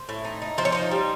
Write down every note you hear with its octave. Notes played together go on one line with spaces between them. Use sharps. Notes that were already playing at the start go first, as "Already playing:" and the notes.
Already playing: C5
A2
D#4
D#4
F3 C5
C#5
D#4 C5
G3